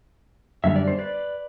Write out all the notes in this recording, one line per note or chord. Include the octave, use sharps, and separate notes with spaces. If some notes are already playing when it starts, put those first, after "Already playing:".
F#2 D3 G3 B3 E5
D5
C5
B4 D5